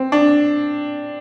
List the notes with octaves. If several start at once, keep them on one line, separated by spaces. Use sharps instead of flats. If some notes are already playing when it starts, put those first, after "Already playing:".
Already playing: C4
D4